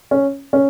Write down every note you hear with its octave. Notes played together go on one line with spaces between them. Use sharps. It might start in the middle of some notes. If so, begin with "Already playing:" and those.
C#4
C#4